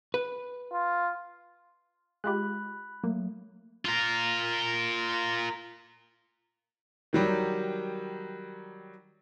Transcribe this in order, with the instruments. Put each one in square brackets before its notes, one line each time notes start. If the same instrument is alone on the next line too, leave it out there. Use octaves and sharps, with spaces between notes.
[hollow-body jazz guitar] B4
[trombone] F4
[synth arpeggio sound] G#3 F4 G4 [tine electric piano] B5 F#6
[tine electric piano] F#3 A3 [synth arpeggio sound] A#3
[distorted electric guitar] F4 A#4
[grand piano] D#3 F#3 G3